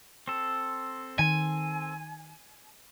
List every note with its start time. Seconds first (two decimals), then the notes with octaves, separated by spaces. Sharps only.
0.28 C4 A4
1.19 D#3 G#5